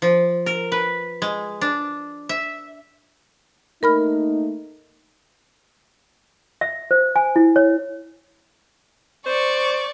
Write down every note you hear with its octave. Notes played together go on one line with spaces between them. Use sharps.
F3
A#4
B4
G#3
D4
E5
A3 A#3 D#4 A#4 B5 F6
E5
C5
G#5
E4
C#5
C5 D5 C#6